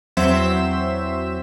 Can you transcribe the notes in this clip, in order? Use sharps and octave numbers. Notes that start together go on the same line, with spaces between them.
E2 F#3 C4 C5 E5 E7